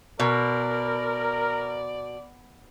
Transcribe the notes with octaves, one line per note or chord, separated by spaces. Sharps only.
B2 A#4 D5